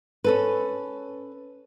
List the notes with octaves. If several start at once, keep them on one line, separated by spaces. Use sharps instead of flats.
C#4 A4 B4